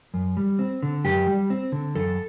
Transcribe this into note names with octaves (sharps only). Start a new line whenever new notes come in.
F#2
G3
C4
D3
F#2 G4
G3
C4
D3
F#2 A4